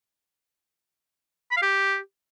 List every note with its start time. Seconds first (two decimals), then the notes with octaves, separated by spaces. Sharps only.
1.51 B5
1.57 F5
1.62 G4